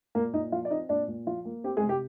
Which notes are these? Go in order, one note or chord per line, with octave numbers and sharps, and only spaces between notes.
A#2 A#3 A#4
A#2 D#4 D#5
F3 F4 F5
D5
C4 D#4 D#5
A#2 D4 D5
A#2
F3 F4
A#3
C4 G4
G#3 G#4
C3
G4